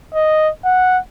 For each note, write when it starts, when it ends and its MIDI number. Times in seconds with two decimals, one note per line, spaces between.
0.14 0.49 75
0.65 0.98 78